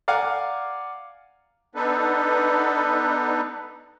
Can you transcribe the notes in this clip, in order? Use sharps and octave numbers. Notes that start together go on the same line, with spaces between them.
D5 F5 F#5 G#5 A#5 D6
B3 D4 D#4 A4 B4